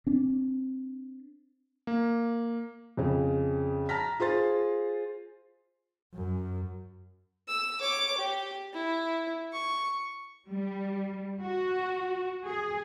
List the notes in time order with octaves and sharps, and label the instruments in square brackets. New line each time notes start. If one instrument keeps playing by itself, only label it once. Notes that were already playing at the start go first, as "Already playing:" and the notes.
[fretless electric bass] C4 D4
[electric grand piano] A#3
[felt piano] F2 C#3
A5 A#5 F6 A#6 B6
F4 G#4 C5 C6 A6
[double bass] F#2
[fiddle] E6
C#5 D6
G4
E4
C#6
[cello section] G3
F#4
G#4